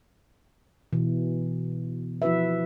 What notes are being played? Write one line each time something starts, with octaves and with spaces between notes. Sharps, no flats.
B2 E3
F3 E4 F#4 B4 E5